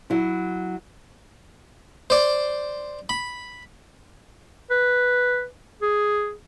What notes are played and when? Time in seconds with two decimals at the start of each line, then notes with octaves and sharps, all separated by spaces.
0.10 F#3 E4
2.10 C5 D5
3.09 B5
4.70 B4
5.82 G#4